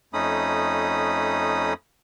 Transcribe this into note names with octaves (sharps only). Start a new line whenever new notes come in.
F2 A3 C#4 D#4 B5 D#6